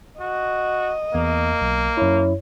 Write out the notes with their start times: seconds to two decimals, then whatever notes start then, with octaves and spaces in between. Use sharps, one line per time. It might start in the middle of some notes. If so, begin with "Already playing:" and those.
0.20 F#4 D#5
1.14 E2 A#3
1.61 B1
1.97 F#2 E4 C#5